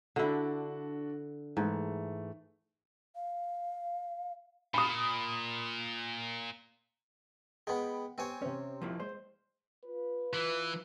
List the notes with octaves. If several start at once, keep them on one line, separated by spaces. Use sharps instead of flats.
D3 D4 E4 F#4 A4
G#2 E3 A3
F5
A#2 B5 D#6
G#3 B3 G5 B5
B3 C4 G4 C#5 G#5
C3 C#4 C5
F3 A#3 E4
G#3 C5
F4 B4
E3